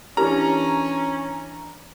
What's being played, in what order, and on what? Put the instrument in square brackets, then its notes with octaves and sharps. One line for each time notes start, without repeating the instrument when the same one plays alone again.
[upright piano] E3 D4 [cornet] C#4 [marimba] E4 G4 A#4 [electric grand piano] A#5